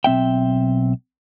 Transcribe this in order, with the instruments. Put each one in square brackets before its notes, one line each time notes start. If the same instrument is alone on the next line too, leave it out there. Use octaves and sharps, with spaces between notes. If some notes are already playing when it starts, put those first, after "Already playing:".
[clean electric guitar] B1 C4 E5 G5